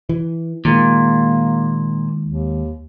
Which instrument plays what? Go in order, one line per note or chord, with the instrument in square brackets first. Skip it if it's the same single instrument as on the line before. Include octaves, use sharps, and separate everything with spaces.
[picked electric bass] E3
[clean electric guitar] A#2 [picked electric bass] D#3 G#3 [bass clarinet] A#3
[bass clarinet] D#2